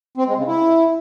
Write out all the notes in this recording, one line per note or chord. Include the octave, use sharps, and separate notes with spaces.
C4
G#3
C#3
E4